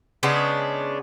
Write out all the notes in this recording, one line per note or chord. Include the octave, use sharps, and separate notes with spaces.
C#3 G#3 B3 D4